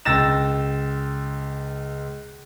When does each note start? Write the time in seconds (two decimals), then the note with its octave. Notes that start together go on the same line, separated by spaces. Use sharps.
0.05 C#2 G5 E6 A6 A#6 E7